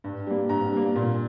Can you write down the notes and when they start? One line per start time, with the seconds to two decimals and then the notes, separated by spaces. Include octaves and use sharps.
0.04 G2
0.27 G3 A#3
0.49 G2 A#5
0.72 G3 A#3
0.96 A#2